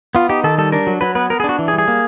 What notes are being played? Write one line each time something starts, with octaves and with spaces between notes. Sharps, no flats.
B3 F4
D#4 G4
D#3 A4
G3 A4
D4 A#4
F#3
F#3 B4
B3 B4
B3 A#4
G#4
D4
F#4
E3
G#4
G3
G#4
A#3